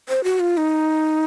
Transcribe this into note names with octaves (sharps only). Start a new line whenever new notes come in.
C5
F#4
F4
D#4